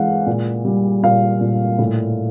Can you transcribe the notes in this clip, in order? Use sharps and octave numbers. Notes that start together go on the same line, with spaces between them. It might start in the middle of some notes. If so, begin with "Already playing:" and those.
Already playing: E3 G#3 F5 F#5
A#2
G3
A#2 F5
A#2
A2